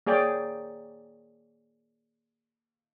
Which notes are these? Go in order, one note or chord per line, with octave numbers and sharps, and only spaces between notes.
A#3 G#4 C#5 D5 G5